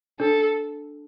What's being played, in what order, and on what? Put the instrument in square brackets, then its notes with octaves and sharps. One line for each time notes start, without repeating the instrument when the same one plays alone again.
[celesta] D4 [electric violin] A4